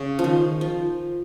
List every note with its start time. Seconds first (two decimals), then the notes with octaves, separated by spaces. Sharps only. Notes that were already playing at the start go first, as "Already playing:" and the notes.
Already playing: C#3
0.19 F3
0.24 D#3
0.61 F3